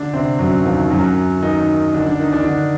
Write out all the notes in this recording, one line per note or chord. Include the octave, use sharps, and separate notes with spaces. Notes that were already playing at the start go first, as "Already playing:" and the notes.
Already playing: D3 D4
C3 C4
F#2 F#3
D#2 D#3
F#2 F#3
D#3 D#4
D3 D4
D3 D4
D#3 D#4
D3 D4
D3 D4